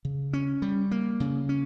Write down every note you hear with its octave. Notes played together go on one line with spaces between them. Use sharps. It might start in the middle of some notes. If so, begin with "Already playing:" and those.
C#3
C#4
G3
A#3
C#3
C#4